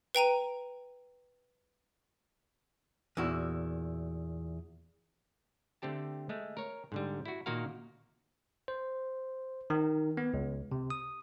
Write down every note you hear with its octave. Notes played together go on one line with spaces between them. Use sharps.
B4 G5 A#5 D#7
E2 A#2 E4 F#4
D3 A3 C4 G4 A5
G#3 A3
A#4 C#5
G#2 D3 G3
E4 F#4
A#2 D#3 A#3 F#4 A#4 F5
C5
D#3
B3
C#2
C3
D#6